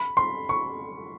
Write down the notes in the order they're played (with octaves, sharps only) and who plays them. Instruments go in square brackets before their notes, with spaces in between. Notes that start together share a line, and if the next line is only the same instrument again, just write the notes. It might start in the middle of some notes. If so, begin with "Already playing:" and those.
Already playing: [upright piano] B5
C6
C#6